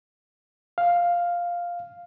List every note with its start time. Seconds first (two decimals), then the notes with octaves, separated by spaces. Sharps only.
0.78 F5